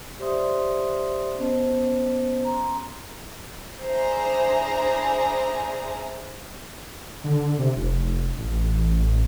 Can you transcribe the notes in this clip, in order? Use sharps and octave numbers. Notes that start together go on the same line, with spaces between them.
G4 C5 D5 E5 C6 D#6
B3 C#4 C5 D#5 A5
A#5 C6
D4 E4 G#4 C5 A#5
D3
C3
F1
A1